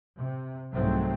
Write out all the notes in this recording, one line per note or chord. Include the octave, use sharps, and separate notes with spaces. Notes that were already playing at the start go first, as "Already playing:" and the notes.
C3
C2 G#2 F#3 A3 C4